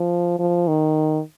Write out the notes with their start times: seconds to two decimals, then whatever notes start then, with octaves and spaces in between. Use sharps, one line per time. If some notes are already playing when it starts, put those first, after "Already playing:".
Already playing: F3
0.39 F3
0.68 D#3